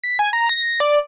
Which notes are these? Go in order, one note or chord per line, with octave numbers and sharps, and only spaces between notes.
B6
G#5
A#5
A#6
D5